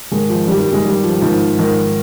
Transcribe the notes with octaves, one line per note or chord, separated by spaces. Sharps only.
G#2 D#3 G#3
F3
G2 D#3 G3
G3
G#3
G2 D#3 G3
F3
G#2 D#3 F3
G#2 D#3